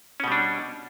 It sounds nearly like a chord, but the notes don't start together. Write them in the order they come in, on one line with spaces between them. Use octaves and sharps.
C#4 B2 G3 D4